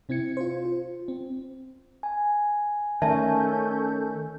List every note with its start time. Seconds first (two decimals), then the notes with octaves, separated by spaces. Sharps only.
0.09 C3 C4 E4 G#6 C#7
0.37 F4 C5
0.65 F4
1.08 C4
2.03 G#5
3.02 D#3 A3 C#4 A4 D5 E5 A5 G6